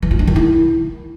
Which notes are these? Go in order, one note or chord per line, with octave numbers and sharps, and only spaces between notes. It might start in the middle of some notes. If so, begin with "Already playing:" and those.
E3
F4
D4
D#3
E4